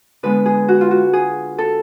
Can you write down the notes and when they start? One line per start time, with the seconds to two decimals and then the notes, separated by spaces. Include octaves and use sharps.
0.23 D3 G#3 B3 B4
0.46 G#4
0.68 F#4
0.81 F4
0.91 F#4
1.13 G#4
1.58 A4